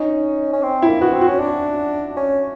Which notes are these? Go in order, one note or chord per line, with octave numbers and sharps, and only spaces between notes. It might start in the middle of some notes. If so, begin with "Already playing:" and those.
Already playing: C#4 D#4
C#4
C4
E4
A#3
B3 F#4
C4
F#4
C#4
D4
C#4